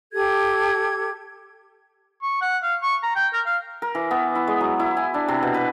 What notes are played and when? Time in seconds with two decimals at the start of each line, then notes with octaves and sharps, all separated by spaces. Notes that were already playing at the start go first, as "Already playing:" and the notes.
0.12 G4 A4 G#6
2.22 C#6
2.42 F#5
2.63 F5
2.83 C#6
3.03 A#5
3.16 G5
3.33 A#4
3.46 F5
3.82 A#4
3.95 E3
4.11 B3
4.35 E4
4.47 G#3
4.60 F#3
4.80 E4
4.97 G#5
5.14 D4
5.28 C3
5.43 B2
5.54 B4